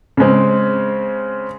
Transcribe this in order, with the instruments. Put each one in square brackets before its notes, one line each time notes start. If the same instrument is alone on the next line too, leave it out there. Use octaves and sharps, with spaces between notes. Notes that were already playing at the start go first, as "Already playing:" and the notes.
[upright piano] C#3 G#3 C4